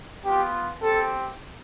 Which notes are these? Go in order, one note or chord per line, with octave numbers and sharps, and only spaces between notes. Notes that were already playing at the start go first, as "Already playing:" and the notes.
B3 F4 G4
C4 G4 A4